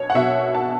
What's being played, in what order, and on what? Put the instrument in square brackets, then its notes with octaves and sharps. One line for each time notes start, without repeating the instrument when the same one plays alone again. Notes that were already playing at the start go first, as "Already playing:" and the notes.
Already playing: [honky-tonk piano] B1 B2 C#5
F#5
B1 B2 E5
A5